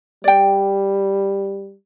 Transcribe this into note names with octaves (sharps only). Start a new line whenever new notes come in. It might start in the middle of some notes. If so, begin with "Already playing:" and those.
G3 D5 G5